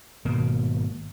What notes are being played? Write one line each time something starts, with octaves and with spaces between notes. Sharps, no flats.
G#1 B2 A#3